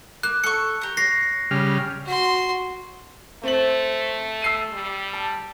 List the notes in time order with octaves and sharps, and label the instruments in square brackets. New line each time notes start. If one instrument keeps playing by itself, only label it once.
[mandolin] A#3 [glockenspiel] F#6
[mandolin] A4 C#6 [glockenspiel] C#7
[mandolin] G4 A#5
[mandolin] C#5 [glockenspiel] A#6 C7
[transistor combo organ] C#3 G3 F6
[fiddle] F#4 C6
[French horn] A3 [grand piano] C4 F#7
[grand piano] E6 C7 D#7
[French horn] G3
[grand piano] A5